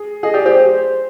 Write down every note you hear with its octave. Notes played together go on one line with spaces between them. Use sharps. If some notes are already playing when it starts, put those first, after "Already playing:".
Already playing: G#4
G#4 D#5
G4 D5
G4 C5